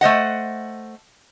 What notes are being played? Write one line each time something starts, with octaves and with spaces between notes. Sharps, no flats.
A3 C5 D#5 F#5